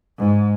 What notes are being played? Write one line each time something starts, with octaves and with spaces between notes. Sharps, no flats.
G#2